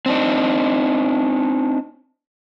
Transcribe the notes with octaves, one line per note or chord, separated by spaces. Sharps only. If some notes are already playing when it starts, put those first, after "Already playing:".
C4 D4 D#4